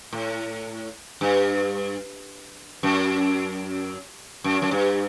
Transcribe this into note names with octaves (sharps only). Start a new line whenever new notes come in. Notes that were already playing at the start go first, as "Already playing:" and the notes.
A2
G2
F#2
F#2
F#2
G2